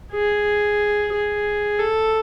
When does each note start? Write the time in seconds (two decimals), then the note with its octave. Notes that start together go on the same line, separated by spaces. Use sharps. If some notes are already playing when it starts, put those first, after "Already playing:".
0.12 G#4
1.13 G#4
1.80 A4